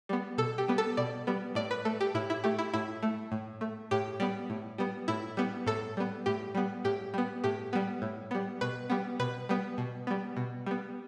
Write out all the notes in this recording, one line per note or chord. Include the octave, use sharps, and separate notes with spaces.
G3 B3
B2 A4
G4
G3 B3
A4
B2 D5
G3 B3
A2 D5
B4
A3 A4
G4
A2 E4
E4
A3 G4
E4
A2 E4
A3
A2
A3
A2 G4
G3 B3
A2
G3 B3
A2 E4
G3 B3
A2 A4
G3 B3
A2 G4
G3 B3
A2 G4
G3 B3
A2 G4
G3 B3
A2
G3 B3
B2 B4
G3 B3
B2 B4
G3 B3
B2
G3 B3
B2
G3 B3